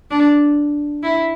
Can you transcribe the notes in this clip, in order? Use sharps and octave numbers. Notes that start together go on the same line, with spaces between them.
D4
E4